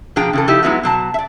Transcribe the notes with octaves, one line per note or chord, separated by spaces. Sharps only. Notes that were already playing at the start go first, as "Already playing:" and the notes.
B2 F3 D4 G#4 G5 A#5
C#3 E3 A4
F3 D#4 E4 G4
F#3 G#3 B3 D#4 E4 F#4
B2 F#3 A5
D5 E5